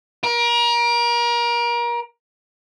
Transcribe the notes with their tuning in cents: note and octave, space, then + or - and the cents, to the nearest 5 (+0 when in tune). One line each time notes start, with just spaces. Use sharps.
A#4 +30